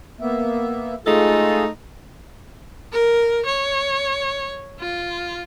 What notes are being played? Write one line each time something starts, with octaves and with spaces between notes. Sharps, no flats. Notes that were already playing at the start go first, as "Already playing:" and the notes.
A#3 B3 E5
G#3 A3 D#4 F4 G#4 A4
A#4
C#5
F4